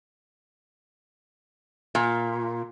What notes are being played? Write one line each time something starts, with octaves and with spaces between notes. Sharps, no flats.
A#2